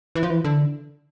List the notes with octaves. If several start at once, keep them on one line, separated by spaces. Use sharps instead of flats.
E3
F3
E3
D3